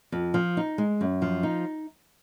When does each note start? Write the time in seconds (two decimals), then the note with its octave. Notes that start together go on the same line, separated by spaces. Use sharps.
0.12 F2
0.34 F3
0.57 D#4
0.78 G#3
1.01 F#2
1.22 F3
1.43 D#4